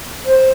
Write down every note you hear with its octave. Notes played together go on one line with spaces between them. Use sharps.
C5